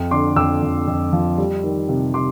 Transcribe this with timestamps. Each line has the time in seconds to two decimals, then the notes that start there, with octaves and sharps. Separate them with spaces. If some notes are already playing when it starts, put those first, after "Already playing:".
Already playing: F2
0.11 D3 C6 D6
0.36 F2 D6 E6
0.63 F2
0.88 F2
1.13 F3
1.38 G3
1.64 D#3
1.89 C3
2.14 C3 C6 D6